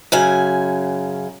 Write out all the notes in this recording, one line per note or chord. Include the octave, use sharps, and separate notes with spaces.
F#2 C#3 G#5